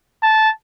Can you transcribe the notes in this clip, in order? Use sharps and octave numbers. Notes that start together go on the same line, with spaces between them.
A5